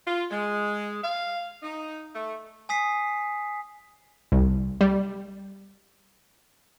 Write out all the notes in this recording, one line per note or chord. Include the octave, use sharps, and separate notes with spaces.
F4
G#3
F5
D#4
A3
G#5 D#6 B6 C7
C2
G3